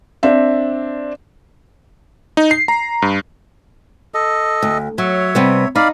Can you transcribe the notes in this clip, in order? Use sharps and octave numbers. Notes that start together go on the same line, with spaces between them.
C4 D4 E5
D#4
C7
A#5
G2
A4 D#5
D2
F#3 C#5 E5
C3 G3 B3
D#4 D5 F5 B5